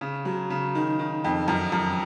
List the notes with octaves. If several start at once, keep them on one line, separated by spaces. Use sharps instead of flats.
C#3
F#3
C#3
D#3
D#3
F2
F#2
F#2